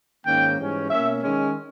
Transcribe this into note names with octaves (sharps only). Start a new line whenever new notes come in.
G#2 D#3 A#3 C#4 G5
G#2 E3 G3 C#4
B2 A#3 C#4 E5
D#3 G#3 C#4